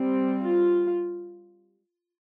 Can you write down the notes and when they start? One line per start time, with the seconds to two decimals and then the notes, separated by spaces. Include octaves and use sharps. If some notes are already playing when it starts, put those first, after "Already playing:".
Already playing: G3 C4
0.41 F4